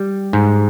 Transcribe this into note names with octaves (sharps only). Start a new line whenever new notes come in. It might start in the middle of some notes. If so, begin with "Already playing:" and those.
Already playing: G3
G#2